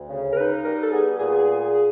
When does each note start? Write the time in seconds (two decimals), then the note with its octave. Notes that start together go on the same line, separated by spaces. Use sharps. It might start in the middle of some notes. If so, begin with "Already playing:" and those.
Already playing: D2
0.10 C#3
0.32 A#4
0.37 D#4 B4
0.64 G3 A#4
0.83 A4
0.92 B3 G#4
1.19 A#2 G#4